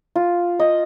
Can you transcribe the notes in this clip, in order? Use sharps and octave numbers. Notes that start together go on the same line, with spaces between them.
F4
D#5